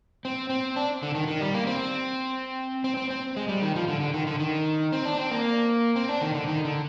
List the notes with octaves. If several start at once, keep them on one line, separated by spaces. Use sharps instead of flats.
C4
C4
D4
D3
D#3
D#3
G3
A#3
C4
C4
C4
C4
G#3
G3
D#3
F3
D3
D3
D#3
D3
D#3
C4
D4
C4
A#3
C4
D4
D#3
D3
D#3
D3